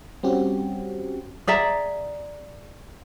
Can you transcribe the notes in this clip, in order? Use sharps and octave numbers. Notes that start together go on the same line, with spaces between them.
G3 C4 C#4 F#4 G4
G#4 D5 E5 A#5